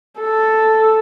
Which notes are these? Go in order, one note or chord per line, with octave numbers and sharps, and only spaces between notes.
A4